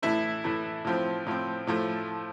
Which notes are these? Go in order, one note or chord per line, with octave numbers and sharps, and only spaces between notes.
A2 E3 A3 E4
A2 E3 A3
A2 F3 C4
A2 F3 C4
A2 F3 A3